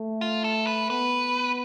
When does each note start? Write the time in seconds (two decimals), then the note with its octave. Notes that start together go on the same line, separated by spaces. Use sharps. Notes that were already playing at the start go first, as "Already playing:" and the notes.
Already playing: A3
0.21 F4
0.44 A4
0.67 B4
0.90 B3 B4